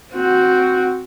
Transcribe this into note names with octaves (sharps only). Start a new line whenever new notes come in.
C4 F#4